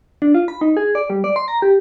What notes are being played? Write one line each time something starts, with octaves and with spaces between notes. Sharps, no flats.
D4
F4
B5
D#4
G#4
D5
G3
D5
C6
A#5
G4